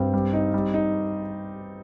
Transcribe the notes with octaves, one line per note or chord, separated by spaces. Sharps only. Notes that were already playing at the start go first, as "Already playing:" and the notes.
Already playing: G2 C4
G3
D#4
G3
D#4